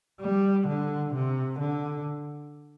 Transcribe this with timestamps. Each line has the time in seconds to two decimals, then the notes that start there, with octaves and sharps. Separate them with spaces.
0.21 G3
0.68 D3
1.14 C3
1.60 D3